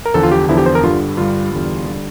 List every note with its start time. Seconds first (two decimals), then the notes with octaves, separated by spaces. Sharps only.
0.06 A#4
0.14 E2 D3 F3 A4
0.23 F4
0.31 G4
0.49 E2 D3 F3 E4
0.58 G4
0.66 C5
0.75 A#4
0.83 G2 D3 G3 F4
1.17 G2 D3 G3 F4
1.52 E2 D3 G3
1.86 D3 G3